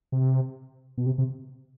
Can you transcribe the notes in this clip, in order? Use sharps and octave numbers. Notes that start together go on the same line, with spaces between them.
C3
B2
C3
C3